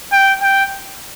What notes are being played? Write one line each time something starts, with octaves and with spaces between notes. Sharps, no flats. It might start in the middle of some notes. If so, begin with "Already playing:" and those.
G5
G5